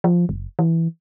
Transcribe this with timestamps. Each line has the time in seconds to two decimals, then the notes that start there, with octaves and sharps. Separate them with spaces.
0.04 F3
0.29 F#1
0.59 E3